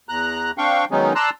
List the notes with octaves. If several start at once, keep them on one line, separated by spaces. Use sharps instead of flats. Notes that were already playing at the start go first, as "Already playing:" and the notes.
E2 A#5 F#6
C4 D4 F5 G5 C#6
D#3 F#3 G#3 B3 C#4 D#4
D5 A5 A#5 C6 E6 F#6